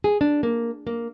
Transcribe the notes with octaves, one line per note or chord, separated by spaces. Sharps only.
G#4
D4
A#3
A#3